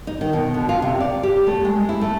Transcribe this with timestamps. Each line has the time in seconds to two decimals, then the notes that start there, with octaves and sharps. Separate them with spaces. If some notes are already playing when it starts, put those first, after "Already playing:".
0.07 D#4
0.21 D#3
0.33 B2
0.54 D3
0.69 F4
0.82 C3
1.01 D5
1.23 G4
1.47 A3
1.65 G#3
1.89 E4
2.01 A3